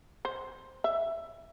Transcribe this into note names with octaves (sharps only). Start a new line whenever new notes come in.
C5
E5